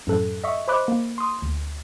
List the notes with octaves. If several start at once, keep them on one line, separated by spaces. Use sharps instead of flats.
F#2 A2 A4 F#6
D#5 E5 C#6 B6
C5 D#5 B5 D6 F#6
A#3
C6 D#6
D2